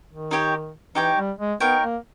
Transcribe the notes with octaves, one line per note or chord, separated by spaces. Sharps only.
D#3
D#4 G4 C#5 G5
E3 D#4 G4 C#5 G5
G3
G#3
B3 D#4 A#4 C#5 G5
A#3